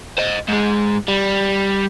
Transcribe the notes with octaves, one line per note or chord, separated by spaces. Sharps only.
C5 D#5
G#2 G#3
G3